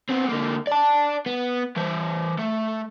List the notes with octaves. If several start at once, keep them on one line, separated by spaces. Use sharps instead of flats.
B3 C4
D3 A#3
D5 A5
B3
E3 C5
A3